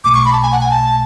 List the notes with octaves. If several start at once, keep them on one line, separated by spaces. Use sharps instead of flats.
B1 B2 A3 D6
C#6
B5
A5
G#5
F#5
G#5
A5